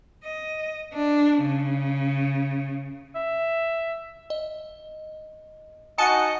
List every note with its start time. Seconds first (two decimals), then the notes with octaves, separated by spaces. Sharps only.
0.23 D#5
0.93 D4
1.43 C#3
3.15 E5
4.30 D#5
5.98 D#4 F#4 D#5 G#5 A5 C#7